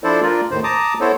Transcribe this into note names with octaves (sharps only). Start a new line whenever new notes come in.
F3 D4 E4 A4 C5 D5
D4 F4 A#4 D5
D#2 A2 D#3 C5
A5 A#5 D6 D#6
B3 E4 A4 C5 C#5